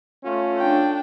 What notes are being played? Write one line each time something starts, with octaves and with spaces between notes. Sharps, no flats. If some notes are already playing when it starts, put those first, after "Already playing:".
A3 C#4 F4
D4 G5